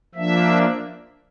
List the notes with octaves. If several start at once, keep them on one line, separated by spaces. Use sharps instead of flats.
F3 A#3 D4 E5